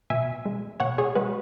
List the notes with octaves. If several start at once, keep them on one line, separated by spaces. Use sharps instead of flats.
B2 E5 G#5
G#3
B2 C#5 F#5
G#4 C#5
G#3 F#4 B4